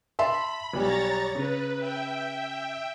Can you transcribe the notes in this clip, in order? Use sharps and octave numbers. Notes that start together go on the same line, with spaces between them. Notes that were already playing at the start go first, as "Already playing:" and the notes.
E5 A5 B5 C6
B1 G3 C#5 A#5 A6
C#3 B4
E5 G5